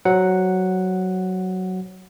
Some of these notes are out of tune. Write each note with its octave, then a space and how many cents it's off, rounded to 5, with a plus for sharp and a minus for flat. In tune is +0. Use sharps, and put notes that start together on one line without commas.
F#3 +10 C5 +5 F#5 +0